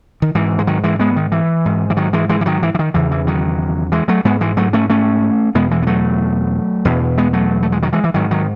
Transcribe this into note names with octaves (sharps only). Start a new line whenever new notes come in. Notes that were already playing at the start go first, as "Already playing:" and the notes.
D#3
G#2 E3
G#3
D#3 F#3
E3 G#3
G#3 B3
D#3
E3
G#2
E3
D#3 F#3
E3 G#3
E3 G#3
E3
D#3 F#3
E3
E3
D#3
E2 C#3 E3
E3
D#3 F#3
E3 G#3
F#3 A3
G#2 G#3 B3
E3 G#3
F#3 A3
A3 C#4
A3 C#4
E2 B2 G#3 B3
E3 G#3
B3
F#3 A3
E2 B2
G#3 B3
F#3 A3
A3
G#3
D#3 F#3
E3 G#3
E3
G#2 D#3 F#3
D#3 F#3